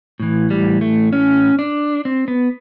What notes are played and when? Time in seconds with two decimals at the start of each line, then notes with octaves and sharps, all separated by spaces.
0.20 A2 E3
0.50 G3
0.81 A3
1.13 C#4
1.59 D4
2.05 C4
2.28 B3